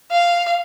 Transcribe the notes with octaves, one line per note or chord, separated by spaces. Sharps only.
F5